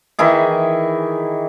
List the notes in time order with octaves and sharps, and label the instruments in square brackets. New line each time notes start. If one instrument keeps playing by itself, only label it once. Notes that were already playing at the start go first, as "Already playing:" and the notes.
[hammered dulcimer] D#3 E3 E4 G#4